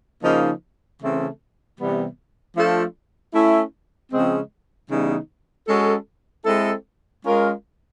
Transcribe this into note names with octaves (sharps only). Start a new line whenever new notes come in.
C#3 F3 A#3 D#4
C#3 E3 A3 C4
C3 E3 G3 B3
F3 A3 D4 F4 A4
A3 C#4 E4
C#3 F3 G#3 C4
C#3 E3 G3 B3 D#4
G#3 C#4 F#4 A4
G#3 C4 E4 A4
G#3 C#4 F4 A#4